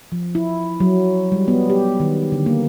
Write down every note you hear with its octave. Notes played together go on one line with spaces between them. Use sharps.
F3
E4
F#3
G3
B3
G4
D#3
D3
A#3